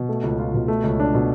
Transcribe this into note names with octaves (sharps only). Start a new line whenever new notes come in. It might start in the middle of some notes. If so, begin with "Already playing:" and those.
Already playing: B2
A3
C#2
F4
B2
A3
C#2
D4
B2